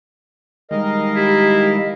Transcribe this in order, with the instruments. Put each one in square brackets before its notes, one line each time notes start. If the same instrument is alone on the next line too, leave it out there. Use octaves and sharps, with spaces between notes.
[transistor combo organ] D#3 G3 G#3 [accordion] A#4 D#5 F5
[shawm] E4 [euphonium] G4